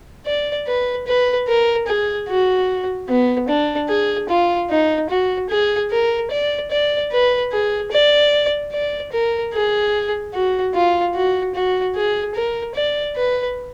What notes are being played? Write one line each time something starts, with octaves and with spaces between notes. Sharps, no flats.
D5
B4
B4
A#4
G#4
F#4
B3
D4
G#4
F4
D#4
F#4
G#4
A#4
D5
D5
B4
G#4
D5
D5
A#4
G#4
F#4
F4
F#4
F#4
G#4
A#4
D5
B4